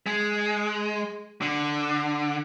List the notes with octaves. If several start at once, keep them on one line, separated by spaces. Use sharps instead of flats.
G#3
D3